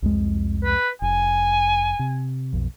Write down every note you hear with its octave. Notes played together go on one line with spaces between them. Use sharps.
C2 F2 G#3
B4
F1 G#5
C3
B1 F2